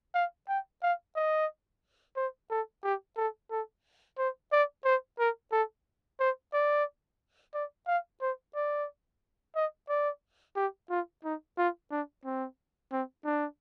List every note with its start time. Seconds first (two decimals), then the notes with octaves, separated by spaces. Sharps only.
0.14 F5
0.49 G5
0.83 F5
1.16 D#5
2.16 C5
2.51 A4
2.84 G4
3.17 A4
3.51 A4
4.18 C5
4.52 D5
4.85 C5
5.19 A#4
5.52 A4
6.20 C5
6.53 D5
7.54 D5
7.87 F5
8.21 C5
8.55 D5
9.56 D#5
9.89 D5
10.56 G4
10.90 F4
11.24 D#4
11.58 F4
11.91 D4
12.25 C4
12.92 C4
13.25 D4